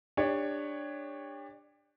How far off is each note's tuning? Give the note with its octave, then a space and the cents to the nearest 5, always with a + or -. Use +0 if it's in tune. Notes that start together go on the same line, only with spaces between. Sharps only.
D4 +10 G4 +30 C#5 +0